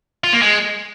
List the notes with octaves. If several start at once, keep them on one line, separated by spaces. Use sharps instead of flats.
F4
A#3
G#3